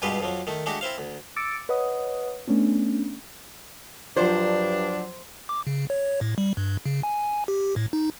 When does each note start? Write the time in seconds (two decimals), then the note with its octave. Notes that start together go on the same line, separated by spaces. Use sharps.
0.02 G2 B2 G#3 F4 G4 B4
0.21 F2 F3 F#3
0.47 D#3 A3
0.66 G#3 A3 D4 F#4 G4 F#5
0.81 C4 E4 C5 F5
0.98 D2
1.36 D6 E6 A6 C#7 D7
1.69 B4 C#5 D#5 F#5 D#6
2.47 A3 B3 C#4 D4
4.17 G2 F3 F#3 D4 C5
5.49 D6
5.67 C#3
5.90 C#5
6.21 A2
6.38 G3
6.57 G2
6.86 C#3
7.03 G#5
7.48 G4
7.76 A2
7.93 D#4